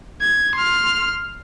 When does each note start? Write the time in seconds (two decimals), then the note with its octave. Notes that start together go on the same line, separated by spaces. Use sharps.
0.21 G#6
0.55 C6 F6